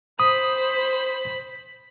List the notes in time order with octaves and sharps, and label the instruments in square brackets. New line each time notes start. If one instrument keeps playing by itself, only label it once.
[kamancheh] C5 [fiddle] B5 [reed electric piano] D#6